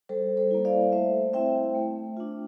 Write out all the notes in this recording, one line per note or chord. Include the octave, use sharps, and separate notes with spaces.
G3 A4 C5
A4 C5
A#3 E4
D5 F5
A3 C5 E5
C4 E4 E5 G5
A3
D4 F4